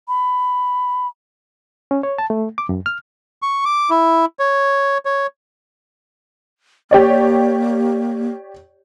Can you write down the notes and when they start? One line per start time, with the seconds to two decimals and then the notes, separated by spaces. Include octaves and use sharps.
0.08 B5
1.91 C#4
2.03 C#5
2.18 A5
2.30 A3
2.58 D6
2.69 F#2
2.86 F6
3.42 C#6
3.65 D6
3.90 E4
4.39 C#5
5.05 C#5
6.91 A#3 G4 C#5 D5